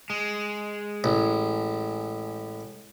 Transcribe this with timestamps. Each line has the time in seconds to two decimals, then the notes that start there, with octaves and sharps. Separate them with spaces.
0.10 G#3
1.04 A1